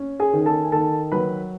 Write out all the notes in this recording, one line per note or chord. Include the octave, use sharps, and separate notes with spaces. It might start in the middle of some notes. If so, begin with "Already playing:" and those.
Already playing: C#4
G#4 G#5
D#3
A4 A5
G#5
D#3 A4 A5
F#3 B4 B5